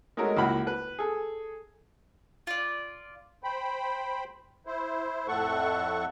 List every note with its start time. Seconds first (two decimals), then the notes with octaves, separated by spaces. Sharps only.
0.17 G#3 A3 D#4 F#4 A#4 C#5
0.37 C#2 A#3 E4 F#4 F#5 B5
0.67 B4
0.99 G#4 A4
2.47 F4 D5
3.43 C5 G5 B5
4.66 E4 C5
5.28 F2 A2 A3 A4 F#5 C#6